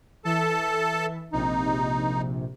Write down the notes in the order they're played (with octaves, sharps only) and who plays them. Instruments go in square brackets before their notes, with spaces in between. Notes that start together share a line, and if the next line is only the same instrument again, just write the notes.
[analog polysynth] E3 E5 [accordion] A4 A5
[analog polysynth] A#1 C3 [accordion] D#4